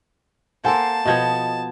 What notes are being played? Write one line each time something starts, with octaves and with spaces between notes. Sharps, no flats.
A#3 A4 C5 F#5 G#5 A5 C6
B2 F3 B3 D#5 G6 G#6